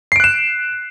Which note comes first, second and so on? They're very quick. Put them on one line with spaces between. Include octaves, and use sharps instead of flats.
C7 D7 F#6 E7